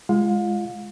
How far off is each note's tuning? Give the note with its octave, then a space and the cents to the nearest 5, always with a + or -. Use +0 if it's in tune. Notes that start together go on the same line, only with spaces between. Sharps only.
G#3 +0 F4 -25 F5 +40